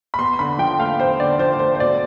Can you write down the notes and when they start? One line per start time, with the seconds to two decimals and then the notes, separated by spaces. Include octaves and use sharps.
0.14 B5
0.19 E2 C6
0.39 D3 B5
0.59 F3 G5
0.79 A3 F5
1.00 E2 C5
1.20 D3 D5
1.39 F3 C5
1.59 A3 C5
1.75 C5
1.80 B2 D5